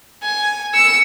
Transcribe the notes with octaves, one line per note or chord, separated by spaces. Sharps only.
G#5
E6 C#7